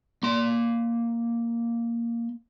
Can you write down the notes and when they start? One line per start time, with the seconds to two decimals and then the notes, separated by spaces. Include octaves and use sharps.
0.23 A#3 C6